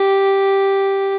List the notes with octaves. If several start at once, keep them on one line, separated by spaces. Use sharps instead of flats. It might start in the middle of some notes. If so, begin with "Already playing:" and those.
Already playing: G4